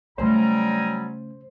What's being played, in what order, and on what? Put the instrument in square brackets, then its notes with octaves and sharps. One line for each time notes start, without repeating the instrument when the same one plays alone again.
[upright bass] C#3 A3 [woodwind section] F#3 G3 [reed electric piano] C5 [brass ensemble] G5 G#5 A#5